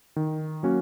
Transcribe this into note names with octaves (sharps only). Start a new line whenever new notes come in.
D#3
F#3 A#3 C#4 F#4